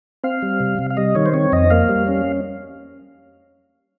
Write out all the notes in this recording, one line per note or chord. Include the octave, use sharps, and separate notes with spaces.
C4 F5
G3
C3
C3
F5
G3 D#5
D#3 C#5
C5
C4 C#5
F2 D#5
A#3 F5
G3
C#4